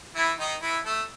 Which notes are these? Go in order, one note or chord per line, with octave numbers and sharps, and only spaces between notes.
E3 E4
D#3 D#4
E3 E4
A3 A4